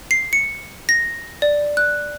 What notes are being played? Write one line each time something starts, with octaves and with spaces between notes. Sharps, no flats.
C7
C#7
A#6
D5
F#6